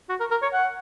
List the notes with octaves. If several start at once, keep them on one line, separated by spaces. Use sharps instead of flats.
F#4
A#4
A#4
C#5
F#5